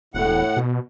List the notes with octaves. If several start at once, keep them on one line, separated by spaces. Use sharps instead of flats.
E1 A2 F#5
B2